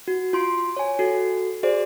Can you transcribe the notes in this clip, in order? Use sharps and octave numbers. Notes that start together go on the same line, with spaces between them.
F#4
F4 C6 D7
C#5 G#5
F#4 A4
F#4 G#4 C5 D5